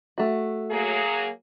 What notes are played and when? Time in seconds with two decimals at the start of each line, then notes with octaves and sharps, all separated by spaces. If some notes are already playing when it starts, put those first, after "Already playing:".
0.18 A3 F#4
0.70 F#3 A#3 G#4